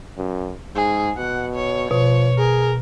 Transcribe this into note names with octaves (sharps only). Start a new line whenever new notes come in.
F#2
G#2 G#4
B2 F#5
C#5
B2 F3 C#5
G#4 A#4